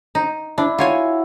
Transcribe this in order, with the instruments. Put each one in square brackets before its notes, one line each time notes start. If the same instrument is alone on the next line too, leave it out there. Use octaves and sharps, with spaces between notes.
[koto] D#4
[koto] D4 [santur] E4
[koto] F4 C#5 G#5 [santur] F#4